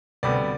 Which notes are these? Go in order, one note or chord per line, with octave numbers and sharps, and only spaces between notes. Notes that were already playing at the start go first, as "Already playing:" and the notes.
D2 C3 G3 B3 D5